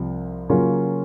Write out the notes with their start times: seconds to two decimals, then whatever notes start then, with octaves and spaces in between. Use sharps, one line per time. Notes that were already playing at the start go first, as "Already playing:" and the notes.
Already playing: C2 C3 F3
0.49 C#3 F#3 A#3 C#4 F4